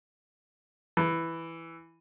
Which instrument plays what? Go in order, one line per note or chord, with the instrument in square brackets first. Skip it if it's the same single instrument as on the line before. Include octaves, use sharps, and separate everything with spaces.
[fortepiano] E3